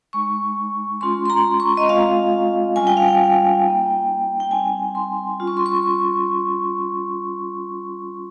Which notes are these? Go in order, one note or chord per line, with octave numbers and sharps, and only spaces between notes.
G#3 D#4 C#6
G#3 C#4 F4 C6
C6
A#5
C#6
D#5
G#3 C4 F4 F5
G3 C#4 F4 G#5
G5
F5
G5
A#3 D#4
G5
G3 C4 D#4 G#5
C6
G3 C#4 F4
C#6
C6
C#6